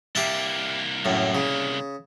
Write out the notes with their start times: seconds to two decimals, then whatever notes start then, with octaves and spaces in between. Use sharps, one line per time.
0.15 C2 A#3 G4 E5 A5
1.05 F#2 A2
1.35 C#3